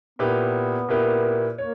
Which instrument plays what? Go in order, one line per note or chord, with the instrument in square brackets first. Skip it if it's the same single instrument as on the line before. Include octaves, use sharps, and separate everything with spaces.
[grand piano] A#2 A#3 E4 G4 B4 [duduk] B3
[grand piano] A#2 A#3 E4 G4 B4
[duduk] A#3 [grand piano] C#5